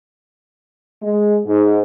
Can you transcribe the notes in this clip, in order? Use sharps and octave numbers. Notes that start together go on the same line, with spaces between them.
G#3
G#2